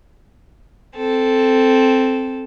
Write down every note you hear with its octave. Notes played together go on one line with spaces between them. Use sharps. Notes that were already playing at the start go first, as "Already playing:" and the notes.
C4 A4